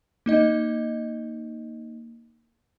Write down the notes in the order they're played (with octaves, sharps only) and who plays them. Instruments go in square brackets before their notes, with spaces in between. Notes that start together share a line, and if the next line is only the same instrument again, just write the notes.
[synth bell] A#3 D#4 D#5